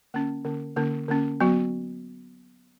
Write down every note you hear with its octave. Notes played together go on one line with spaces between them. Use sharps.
D3 A#3 C#4
D3 A#3 C#4
D3 A#3 C#4
D3 A#3 C#4
F#3 B3 F#4